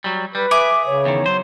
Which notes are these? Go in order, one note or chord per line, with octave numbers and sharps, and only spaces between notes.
F#3 G3
G3 B4
G#4 E5 D6
C#3 C#5
E2 D#3
F#3 C5